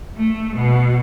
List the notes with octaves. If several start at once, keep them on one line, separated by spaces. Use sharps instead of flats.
A3
B2